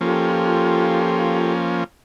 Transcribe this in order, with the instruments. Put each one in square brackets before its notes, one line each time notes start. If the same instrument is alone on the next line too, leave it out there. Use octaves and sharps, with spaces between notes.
[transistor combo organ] F3 A#3 C#4 [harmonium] F4 G4 A4